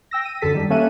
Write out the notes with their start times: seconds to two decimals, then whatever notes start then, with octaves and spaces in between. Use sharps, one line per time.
0.11 G5 E6 A#6
0.25 D#7
0.41 F#2 D3 A4 B6
0.54 D#3 G3
0.70 A#3 C#4 A4 E5 F#6 D#7